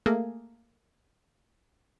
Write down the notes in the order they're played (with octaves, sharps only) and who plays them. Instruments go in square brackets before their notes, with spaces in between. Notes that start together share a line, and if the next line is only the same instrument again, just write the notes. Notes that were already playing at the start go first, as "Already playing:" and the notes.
[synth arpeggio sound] A3 A#3 G#4